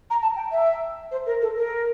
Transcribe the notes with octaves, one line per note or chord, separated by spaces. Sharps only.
A#5
A5
G5
E5
C5
A#4
A4
A#4